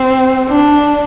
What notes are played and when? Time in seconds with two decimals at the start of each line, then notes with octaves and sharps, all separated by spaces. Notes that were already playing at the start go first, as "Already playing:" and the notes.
Already playing: C4
0.48 D4